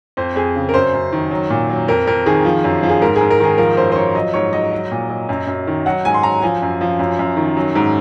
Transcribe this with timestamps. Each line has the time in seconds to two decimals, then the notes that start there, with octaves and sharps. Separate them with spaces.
0.17 F2 C5
0.36 F2 G#4
0.56 C#3
0.69 A#4
0.74 F#2 C5
0.94 F#2
1.12 D#3
1.31 F#3
1.50 A#2
1.69 F#3
1.88 F2 A#4
2.07 F2 A#4
2.26 D#3 G#4
2.45 F3
2.64 F#2
2.83 F3
2.89 G#4
3.02 G#2 A#4
3.16 G#2 G#4
3.30 A#4
3.40 D#3 G#4
3.58 F3 A#4
3.77 F#2 C5
3.92 C5
3.96 F3 C#5
4.15 F#3 D#5
4.34 G#2 C#5
4.53 F#3 D#5
4.72 F#3
4.91 A#2
5.09 F#3
5.29 F#2
5.47 F#2
5.67 D#3
5.86 F#3 F#5
6.05 G#2 G#5
6.14 C6
6.23 F#3 A#5
6.42 F3 G#5
6.62 F#2
6.81 F3
6.99 F#2
7.19 F#2
7.37 D#3
7.57 F#3
7.75 G#2